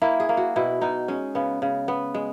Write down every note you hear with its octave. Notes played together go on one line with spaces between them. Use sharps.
A#3 E4
G#4
A#3
F#4
B2 E4
B2 D#4
G#3 C#4
C#3 B3
C#3
B3
G#3